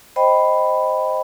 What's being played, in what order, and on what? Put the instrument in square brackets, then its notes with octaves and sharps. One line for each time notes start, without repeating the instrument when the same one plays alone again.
[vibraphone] C5 D#5 G5 B5